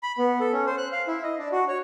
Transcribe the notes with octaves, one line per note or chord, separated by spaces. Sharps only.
B5
B3
A4
C#4
C5
F#6
F5
E4
D#5
D4
F#4
C#5